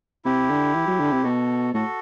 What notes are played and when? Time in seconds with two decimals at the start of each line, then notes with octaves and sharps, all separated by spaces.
0.25 C3 E4 G4
0.50 D3
0.74 E3
0.87 F#3
0.99 D3
1.12 C3
1.24 B2 F#4 A4
1.74 A2 F#4 A4